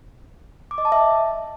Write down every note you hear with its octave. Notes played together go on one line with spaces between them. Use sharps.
D6
D#5
A5
E5